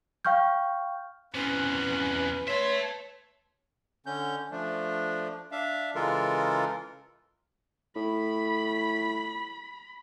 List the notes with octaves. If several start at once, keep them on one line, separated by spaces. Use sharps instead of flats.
F5 G5 C#6 F6 G6
E2 C3 C#4 B4 F#6
A4 C#5 E5 C6
D3 C#4 G6
F3 A3 D4
D4 E5 F5
C#3 E3 G#3 F4 A4 A#4
A2 B5